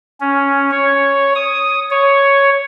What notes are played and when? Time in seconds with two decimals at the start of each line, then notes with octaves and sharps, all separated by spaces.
0.20 C#4
0.71 C#5
1.35 D#6
1.91 C#5